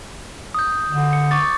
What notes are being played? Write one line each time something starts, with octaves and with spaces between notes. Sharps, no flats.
D#6 G6
D3
C#7
C#6 D6 A6